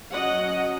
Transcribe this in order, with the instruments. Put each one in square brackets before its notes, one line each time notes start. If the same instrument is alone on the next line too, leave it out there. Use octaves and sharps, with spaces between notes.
[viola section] F#3 C#4 D#5 F#5